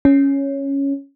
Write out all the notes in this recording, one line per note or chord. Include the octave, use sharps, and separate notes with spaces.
C#4